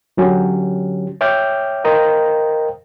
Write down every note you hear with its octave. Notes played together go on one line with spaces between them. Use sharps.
D3 F#3 C#4 G4
C#5 E5 G5 D6 F6 G6
A#4 C5 D#5 F5 G5 A#5